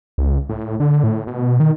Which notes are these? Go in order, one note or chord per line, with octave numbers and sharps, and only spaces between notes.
C#2
A2
D3
A2
B2
D#3